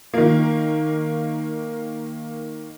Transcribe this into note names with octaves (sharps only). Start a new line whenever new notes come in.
D#3 A#3